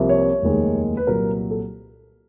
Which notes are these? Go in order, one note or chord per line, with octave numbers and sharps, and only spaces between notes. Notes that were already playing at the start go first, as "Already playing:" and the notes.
Already playing: C2 C3 F3 A#3
C#5
F1 D#2 D#3 G#3
B4
C2 A#2 F#3 A#4
A4